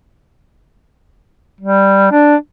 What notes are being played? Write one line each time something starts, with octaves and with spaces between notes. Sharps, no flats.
G3
D4